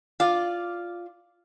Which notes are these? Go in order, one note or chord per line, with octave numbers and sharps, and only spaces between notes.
F4 D5